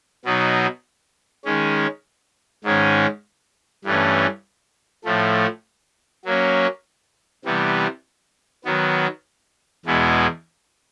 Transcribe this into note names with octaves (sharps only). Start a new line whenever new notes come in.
B2 F#3 B3 D#4
D#3 G#3 C#4
G#2 D#3 G#3 C#4
G2 E3 A3 C#4
A2 F3 A3
F#3 A#3 C#4
C3 E3 G3 B3
D#3 F#3 B3
E2 B2 G#3 B3 E4